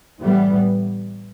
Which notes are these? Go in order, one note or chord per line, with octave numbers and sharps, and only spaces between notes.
A2 E3 G3 B3